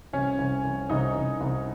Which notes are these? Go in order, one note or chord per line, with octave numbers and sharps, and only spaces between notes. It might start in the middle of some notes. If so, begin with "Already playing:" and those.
C2 C#4
C2
C2
C2 D#4
C2
C2